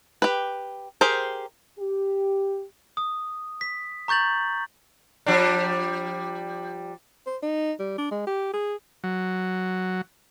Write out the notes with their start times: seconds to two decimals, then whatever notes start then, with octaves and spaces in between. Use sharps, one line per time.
0.22 G4 B4
1.01 G4 G#4 A#4 C5
1.78 G4
2.97 D#6
3.61 B6
4.08 A#5 C#6 G6 A6 F#7
5.26 F3 G3 D4
7.27 C5
7.43 D#4
7.79 G3
7.98 D4
8.11 G#3
8.27 G4
8.53 G#4
9.04 F#3